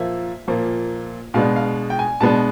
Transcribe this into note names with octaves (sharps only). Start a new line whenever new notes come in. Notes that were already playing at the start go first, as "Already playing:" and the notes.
Already playing: A#2 F3 A#3 E5
A#2 F3 A#3
B2 G#3 B3 D4 F5
F5
G5
G#5
B2 G#3 B3 D4 A5